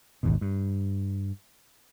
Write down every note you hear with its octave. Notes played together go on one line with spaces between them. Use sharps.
G#1 D#2 B2
G2